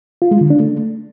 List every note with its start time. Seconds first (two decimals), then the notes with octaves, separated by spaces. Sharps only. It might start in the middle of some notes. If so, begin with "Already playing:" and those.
0.22 F4
0.31 G#3
0.41 D3
0.50 D4
0.60 A3